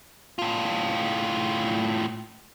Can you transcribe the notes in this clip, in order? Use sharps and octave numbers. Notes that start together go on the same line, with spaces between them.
A2 F4